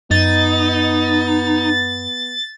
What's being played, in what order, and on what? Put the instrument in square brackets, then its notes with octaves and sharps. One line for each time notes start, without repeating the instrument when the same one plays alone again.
[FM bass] F#2 [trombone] B3 [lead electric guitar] D#4 [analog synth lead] A6